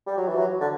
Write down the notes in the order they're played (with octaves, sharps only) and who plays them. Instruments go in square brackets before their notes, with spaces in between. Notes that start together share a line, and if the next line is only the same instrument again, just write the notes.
[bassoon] G3
F#3
E3
F#3
D3